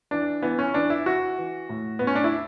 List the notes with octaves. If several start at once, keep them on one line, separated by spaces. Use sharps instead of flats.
E3 D4
E3 B3
C#4
E3 D4
E4
E3 F#4
E3
A2
A2 B3
C#4
D4
E4